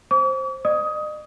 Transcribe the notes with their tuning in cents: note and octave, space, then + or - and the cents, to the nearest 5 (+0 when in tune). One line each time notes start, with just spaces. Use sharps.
C5 +10 D6 -45
D#5 -45 D#6 +15